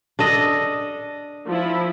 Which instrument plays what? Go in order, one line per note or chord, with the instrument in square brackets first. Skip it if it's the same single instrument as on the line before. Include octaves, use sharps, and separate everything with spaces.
[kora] D4 A4 D#5
[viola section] F3 E4